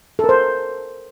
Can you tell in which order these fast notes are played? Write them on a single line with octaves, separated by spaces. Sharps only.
A4 A#4 C5